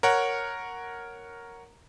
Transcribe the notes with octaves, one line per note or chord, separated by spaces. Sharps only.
A#4 C#5 F#5